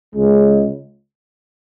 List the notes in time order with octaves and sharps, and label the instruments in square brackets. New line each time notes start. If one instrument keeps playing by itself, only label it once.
[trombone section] C#2 C#3 G#3